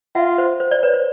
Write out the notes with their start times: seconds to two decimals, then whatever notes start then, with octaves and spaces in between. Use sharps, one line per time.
0.15 F4 E5 F#5
0.38 C5
0.60 C5
0.71 C5 D5
0.83 B4 C#5
0.94 C5